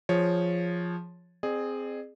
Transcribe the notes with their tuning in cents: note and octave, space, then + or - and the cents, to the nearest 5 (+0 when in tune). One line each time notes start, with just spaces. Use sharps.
F3 +0 G#4 +0 C#5 +0
C4 +0 G#4 +0 D5 +45